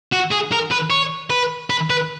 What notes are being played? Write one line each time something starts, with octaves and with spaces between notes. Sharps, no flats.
F#4
G#4
A#4
B4
C#5
B4
B4
B4